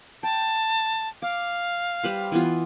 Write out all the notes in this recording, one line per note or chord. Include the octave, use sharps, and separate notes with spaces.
G5 A5
F5 D6
G3 B4 C5
E3 B3 F4